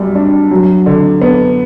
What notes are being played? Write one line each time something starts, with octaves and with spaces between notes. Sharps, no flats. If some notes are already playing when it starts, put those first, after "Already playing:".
Already playing: F#2 G3
D4
F#3
D3
B3